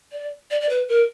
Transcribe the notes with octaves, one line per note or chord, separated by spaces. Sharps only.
D5
D5
D5
B4
A#4